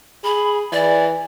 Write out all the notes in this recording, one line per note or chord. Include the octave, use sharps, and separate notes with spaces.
G#4 B5
E3 D5